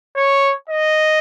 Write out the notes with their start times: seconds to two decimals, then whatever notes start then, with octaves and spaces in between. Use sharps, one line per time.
0.16 C#5
0.69 D#5